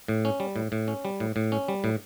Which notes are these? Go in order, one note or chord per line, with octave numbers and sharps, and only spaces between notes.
A2
C#4
G3
A2
A2
C#4
G3
A2
A2
C#4
G3
A2